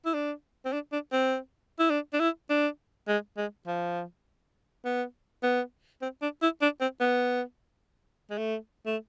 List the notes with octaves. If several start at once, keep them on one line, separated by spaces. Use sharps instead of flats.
E4
D4
C4
D4
D4
C4
E4
D4
D4
E4
D4
G#3
G#3
F3
B3
B3
C4
D4
E4
D4
C4
B3
G#3
A3
A3